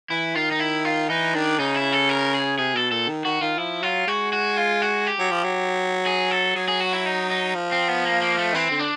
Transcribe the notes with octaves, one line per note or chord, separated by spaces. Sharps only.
E3 E4
D#3 F4
D#4
E4
F4
E3 D#4
D#3 D4
C#3 D#4
E4
A4
A#4
G#4
C3 G#4
B2 A4
A#2 A4
D#3
D#3 F#4
D#3 F4
F3 E4
F#3 F4
G#3 F#4
F#4
F4
F#4
G4
F#3
F3
F#3
G#4
A4
F#3 G#4
G#4
F#4
E4
D#4
D#4
F3
C4
B3
A#3
A#3
A3
E3 C4
D3
D4